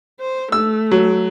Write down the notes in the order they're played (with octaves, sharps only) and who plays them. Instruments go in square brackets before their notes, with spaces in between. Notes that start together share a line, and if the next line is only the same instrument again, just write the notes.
[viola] C5
[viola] A3 [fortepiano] E6
[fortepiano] F#3